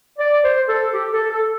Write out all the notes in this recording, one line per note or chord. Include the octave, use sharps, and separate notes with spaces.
D5
C5
A4
G4
A4
A4